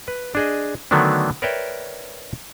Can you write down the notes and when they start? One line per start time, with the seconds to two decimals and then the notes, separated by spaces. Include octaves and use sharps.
0.08 B4
0.35 D4 G#4 D#5
0.91 D3 D#3 F#3 A3 B3 D4
1.42 A#4 B4 C#5 D5 E5 G5